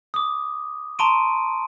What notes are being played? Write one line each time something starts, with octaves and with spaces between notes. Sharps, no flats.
D6 D#6
A5 A#5 C6 C#6 D7 D#7